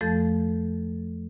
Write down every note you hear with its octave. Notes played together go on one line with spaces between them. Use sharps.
F2 F3 A3 A4 G6 A6